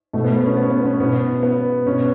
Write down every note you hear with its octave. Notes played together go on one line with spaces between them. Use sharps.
B2 A3
B3
B3
C#4
B3
B3
C#4
B2 B3
B3
B2 C#4